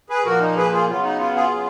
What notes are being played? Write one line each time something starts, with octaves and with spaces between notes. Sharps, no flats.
G#4 B4
A#2 F3 A#3 F#4 A#4
D#4
G#4 B4
F4 G#4
C#3 F#3 B3 F4
D#4
F4
F4 G#4
C#3 F#3 B3